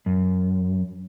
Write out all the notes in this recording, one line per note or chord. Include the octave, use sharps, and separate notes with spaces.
F#2